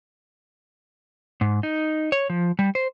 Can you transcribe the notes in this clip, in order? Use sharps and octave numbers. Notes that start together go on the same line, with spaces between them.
G#2
D#4
C#5
F3
G3
C5